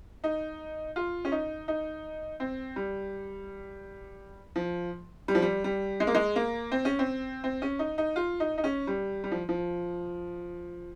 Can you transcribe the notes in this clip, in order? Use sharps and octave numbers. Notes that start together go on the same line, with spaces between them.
D#4
F4
C#4
D#4
D#4
C4
G3
F3
G3
F3
G3
G3
G#3
A#3
G#3
A#3
C4
C#4
C4
C4
C#4
D#4
D#4
F4
D#4
D#4
C#4
G3
G3
F3
F3